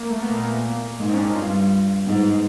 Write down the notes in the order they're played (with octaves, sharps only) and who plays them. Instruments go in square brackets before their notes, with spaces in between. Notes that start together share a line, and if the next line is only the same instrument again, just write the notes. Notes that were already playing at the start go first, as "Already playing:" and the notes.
Already playing: [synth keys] A#3
A3
B3
[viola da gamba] A#2 [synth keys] A#3
[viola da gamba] G#2 [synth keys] G#3
[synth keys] C4
C#4
D4
D#4
[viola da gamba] G2 [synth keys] F4
[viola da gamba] G#2 [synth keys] B3
[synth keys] B3